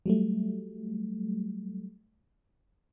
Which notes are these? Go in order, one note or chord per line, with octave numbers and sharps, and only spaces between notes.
F#3 G3 A3